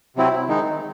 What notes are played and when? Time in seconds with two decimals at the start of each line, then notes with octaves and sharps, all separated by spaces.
0.16 C3 F#3 C4 E4
0.48 D#3 G#3 D#4